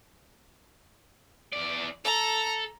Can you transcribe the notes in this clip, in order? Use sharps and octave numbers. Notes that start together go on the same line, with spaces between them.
E2 D5
A4 A#5